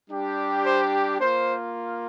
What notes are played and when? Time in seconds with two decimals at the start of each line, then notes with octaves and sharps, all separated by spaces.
0.09 G3 D4 G4
0.65 C5
1.20 A#3 F4 C5